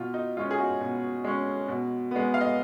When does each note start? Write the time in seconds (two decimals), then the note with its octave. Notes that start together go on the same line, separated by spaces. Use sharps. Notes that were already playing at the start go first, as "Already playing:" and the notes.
Already playing: B2 F4
0.14 D#4
0.37 G#3 C#4 F4
0.51 G#4
0.58 D#4 F#4
0.81 B2
1.24 G#3 C#4
1.68 B2
2.11 G#3 B3
2.34 F5
2.41 D#5